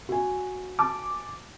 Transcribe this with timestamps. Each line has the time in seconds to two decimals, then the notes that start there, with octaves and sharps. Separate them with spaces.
0.09 F#4 G#5
0.79 A5 D6